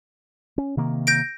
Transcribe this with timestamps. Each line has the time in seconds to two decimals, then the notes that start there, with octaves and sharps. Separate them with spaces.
0.58 C#4
0.77 C3 D#3 A#3
1.07 G6 A#6 D7